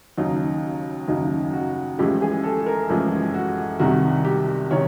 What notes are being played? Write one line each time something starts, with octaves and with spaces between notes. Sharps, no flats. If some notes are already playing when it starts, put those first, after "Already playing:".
D#2 C#3 F#3 D#4
D#2 C#3 F#3 D#4
F#4
A1 A2 F3 G#3 G4
G#4
A4
A#4
A1 A2 F3 G#3
F#4
C2 C3 D#3 F#4
G4
C3 D#3 C#5